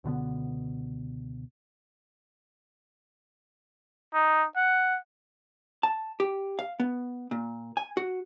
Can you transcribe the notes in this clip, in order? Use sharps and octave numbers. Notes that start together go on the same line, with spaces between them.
C#2 B2 D3 B3
D#4
F#5
A5
G4
F5
B3
A#2
G#5
F#4